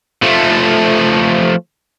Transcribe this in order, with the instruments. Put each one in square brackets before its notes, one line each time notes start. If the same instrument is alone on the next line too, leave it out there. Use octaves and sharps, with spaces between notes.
[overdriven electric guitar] F3 A3